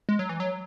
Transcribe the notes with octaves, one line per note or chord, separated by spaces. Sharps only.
G#3
F#3
E3
F#3